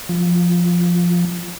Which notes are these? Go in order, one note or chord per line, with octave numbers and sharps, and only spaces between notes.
F3